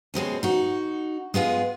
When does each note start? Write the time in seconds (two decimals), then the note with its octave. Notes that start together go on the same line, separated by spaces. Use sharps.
0.14 B2 G#3 C4 C#4
0.43 D#4 F#4
1.34 G#3 B3 F4 G#4